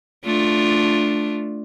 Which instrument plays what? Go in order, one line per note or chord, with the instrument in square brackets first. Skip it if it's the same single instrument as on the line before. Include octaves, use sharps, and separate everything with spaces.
[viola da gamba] A3 D4 F4